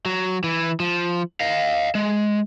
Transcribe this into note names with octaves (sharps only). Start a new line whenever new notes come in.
F#3
E3
F3
D#5 F5
G#3